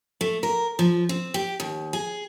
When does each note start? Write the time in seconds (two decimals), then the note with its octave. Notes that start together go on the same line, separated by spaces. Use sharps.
0.21 A3
0.43 A#4
0.79 F3
1.09 C4
1.34 G4
1.60 D#2
1.93 G#4